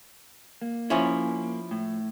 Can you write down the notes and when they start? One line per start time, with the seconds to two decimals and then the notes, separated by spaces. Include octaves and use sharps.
0.62 A#3
0.90 F3 C#4 E4
1.71 A2